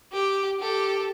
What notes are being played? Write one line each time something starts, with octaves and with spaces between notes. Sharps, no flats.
G4
G4 A4